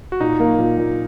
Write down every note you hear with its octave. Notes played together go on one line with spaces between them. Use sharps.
F#4
A#2 D#4
A#3
A#2
A#2